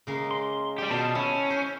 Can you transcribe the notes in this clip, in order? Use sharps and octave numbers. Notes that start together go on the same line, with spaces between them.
C#3 G#3 A#3
C6
G3 G4
B2 F4 C5 F5 A5
C#4 E4
C5 G#5